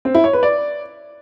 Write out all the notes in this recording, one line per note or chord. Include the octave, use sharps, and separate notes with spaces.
C4
E4
C#5
B4
D5